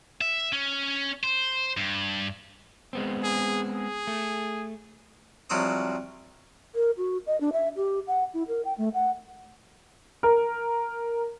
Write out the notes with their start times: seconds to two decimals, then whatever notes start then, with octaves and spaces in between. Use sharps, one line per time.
0.21 E5
0.53 C#4
1.24 C5
1.77 G2
2.93 G#3 B3 C4
3.24 G#4
3.75 G#4
4.07 A3
5.50 C2 F3 F#3 C4 D#6
6.75 A#4
6.97 F#4
7.27 D#5
7.41 D4
7.53 E5
7.76 G4
8.07 F#5
8.34 E4
8.48 A#4
8.65 G5
8.78 A3
8.94 F#5
10.23 A#4